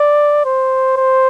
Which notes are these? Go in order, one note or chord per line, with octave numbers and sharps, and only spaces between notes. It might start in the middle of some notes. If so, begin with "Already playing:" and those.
Already playing: D5
C5
C5